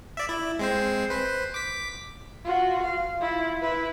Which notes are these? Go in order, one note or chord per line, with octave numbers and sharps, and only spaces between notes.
D5 E5
E4
G#3 C4 C5
B4 C5
D6 B6
F4 F#4
F5
E4 F4
E4 B4